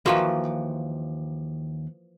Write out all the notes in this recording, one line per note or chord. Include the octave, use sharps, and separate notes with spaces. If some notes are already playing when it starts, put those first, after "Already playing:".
D#2 E3 F3 A#3 F#4 C6